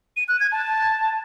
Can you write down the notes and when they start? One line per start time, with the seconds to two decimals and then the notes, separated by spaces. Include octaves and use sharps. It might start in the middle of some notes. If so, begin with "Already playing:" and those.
0.16 D#7
0.28 F#6
0.40 G#6
0.52 A5